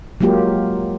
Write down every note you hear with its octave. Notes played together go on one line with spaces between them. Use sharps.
F#3 G#3 A#3 F4 G4